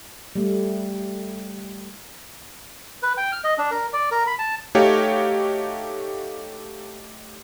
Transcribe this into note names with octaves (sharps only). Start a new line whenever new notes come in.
G3 A3
B4
G5
F6
D#5
D4
A#4
D5
A#4
B5
A5
A3 D#4 F#4 G4 C#5 F5